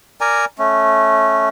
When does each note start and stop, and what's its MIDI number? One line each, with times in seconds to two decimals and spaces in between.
0.21 0.45 70
0.21 0.45 74
0.21 0.45 80
0.21 0.45 82
0.58 1.49 57
0.58 1.49 61